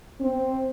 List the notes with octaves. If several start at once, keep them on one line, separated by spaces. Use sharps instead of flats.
C4